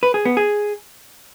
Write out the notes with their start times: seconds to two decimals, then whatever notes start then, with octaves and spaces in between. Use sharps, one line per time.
0.03 B4
0.14 G#4
0.25 B3
0.37 G#4